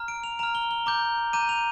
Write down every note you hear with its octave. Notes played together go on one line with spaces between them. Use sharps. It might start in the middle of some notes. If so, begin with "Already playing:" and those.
Already playing: A#5 F6
D7
F7
A#5 F6 F7
G7
G7
A#5 D6 G6
A#5 D6 G6 D#7
F7